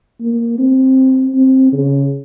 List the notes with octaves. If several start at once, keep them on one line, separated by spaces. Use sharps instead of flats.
A#3
C4
C4
C#3